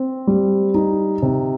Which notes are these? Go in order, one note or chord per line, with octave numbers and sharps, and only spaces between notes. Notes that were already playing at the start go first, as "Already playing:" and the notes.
Already playing: C4
G3
D#4
C3